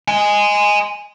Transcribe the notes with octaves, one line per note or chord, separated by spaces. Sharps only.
D#5 G#5